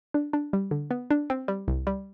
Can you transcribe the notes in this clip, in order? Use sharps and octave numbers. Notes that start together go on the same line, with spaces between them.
D4
D4
G3
D3
B3
D4
C4
G3
C2
G3